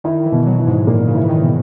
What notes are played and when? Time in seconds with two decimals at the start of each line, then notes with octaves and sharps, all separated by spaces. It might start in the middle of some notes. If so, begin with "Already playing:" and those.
0.04 D#3 E4
0.26 E3
0.32 B2
0.46 F#3
0.59 E4
0.67 G#2
0.87 A#2 A#3
1.08 C#3
1.15 E4
1.23 E3
1.29 D#3
1.42 B2